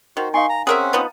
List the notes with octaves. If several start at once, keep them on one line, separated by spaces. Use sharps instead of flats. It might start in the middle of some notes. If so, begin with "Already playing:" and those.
D#3 F#4 C5
D#4 F5 G#5 C6 C#6
A#5
C4 C#4 G#4 A#4 E5 F#5
F3 B3 D#4